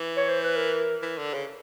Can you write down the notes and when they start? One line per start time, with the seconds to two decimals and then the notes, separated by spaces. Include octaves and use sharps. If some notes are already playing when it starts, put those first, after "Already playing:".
Already playing: E3
0.17 C#5
0.29 C5
0.44 B4
0.56 A#4
1.02 E3
1.18 D3
1.33 C#3